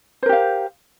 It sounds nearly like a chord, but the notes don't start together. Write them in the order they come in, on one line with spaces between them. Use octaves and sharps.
C5 A#4 G4 F5